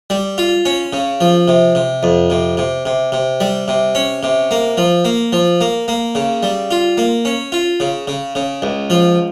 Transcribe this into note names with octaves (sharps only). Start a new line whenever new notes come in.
G3
F4
C#4
C#3
F3
C3
C3
F2
C3
C3
C3
C3
G3
C3
C#4
C3
A#3
F3
A#3
F3
A#3
A#3
C#3
G3
F4
A#3
C#4
F4
C#3
C#3
C#3
C#2
F3